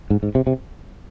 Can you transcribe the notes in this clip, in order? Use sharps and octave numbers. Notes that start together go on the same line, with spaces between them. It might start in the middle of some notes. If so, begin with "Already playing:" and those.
G#2
G#2
C3
C3